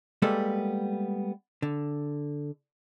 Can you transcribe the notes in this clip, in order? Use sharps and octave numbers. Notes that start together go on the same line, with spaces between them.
G3 G#3 A#3 B3 A4
D3